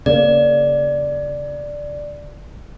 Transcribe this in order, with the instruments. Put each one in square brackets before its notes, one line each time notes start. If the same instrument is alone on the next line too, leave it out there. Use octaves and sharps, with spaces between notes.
[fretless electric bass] C#3 A#3 [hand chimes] D5